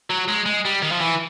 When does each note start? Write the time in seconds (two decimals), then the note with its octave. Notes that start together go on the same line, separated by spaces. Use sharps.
0.10 F#3
0.28 G#3
0.46 G#3
0.65 G3
0.82 D#3
0.92 F3
1.01 E3